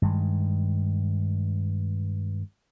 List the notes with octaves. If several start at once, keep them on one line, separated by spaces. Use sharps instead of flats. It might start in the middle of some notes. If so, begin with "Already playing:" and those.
G2 D#3 G#3